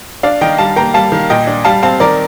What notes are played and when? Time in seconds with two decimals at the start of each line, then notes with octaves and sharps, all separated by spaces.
0.23 D4 D5 F5
0.41 D#3 D#5 G5
0.58 G3 F5 A5
0.76 A#3 G5 A#5
0.94 G3 F5 A5
1.12 D#3
1.30 A#2 D#5 G5
1.47 D4
1.65 G3 F5 A5
1.83 C4 F5 A5
2.00 D#3 A#4 D5